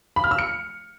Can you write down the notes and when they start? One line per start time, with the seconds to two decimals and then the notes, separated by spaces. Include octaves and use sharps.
0.16 B5
0.24 F6
0.31 E6
0.39 C#7